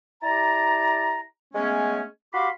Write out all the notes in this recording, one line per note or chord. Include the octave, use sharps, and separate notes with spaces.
E4 G4 D5 A5 A#5
G#3 A3 B3 C#4
F#4 G4 F5 B5 C6 D6